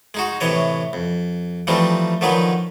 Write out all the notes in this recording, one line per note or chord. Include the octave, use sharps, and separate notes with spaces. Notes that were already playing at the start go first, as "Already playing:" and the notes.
G#3 D#4 F#4
A2 C3 E3 C#5 D#5
F2
E3 F3 G3 A3 C4 D#4
D3 D#3 F3 F#3 D#4 B4